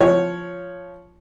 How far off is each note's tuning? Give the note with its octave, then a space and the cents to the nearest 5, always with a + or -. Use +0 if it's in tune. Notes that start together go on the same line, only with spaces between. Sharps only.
F3 -5 C#5 +0